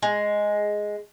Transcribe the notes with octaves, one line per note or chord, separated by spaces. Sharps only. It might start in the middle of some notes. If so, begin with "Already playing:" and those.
G#3